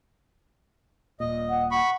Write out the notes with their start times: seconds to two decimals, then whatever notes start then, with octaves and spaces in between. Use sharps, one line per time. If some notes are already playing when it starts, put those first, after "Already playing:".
1.20 D#1 A#2 D#5
1.49 F#5
1.71 F#5 B5 C#6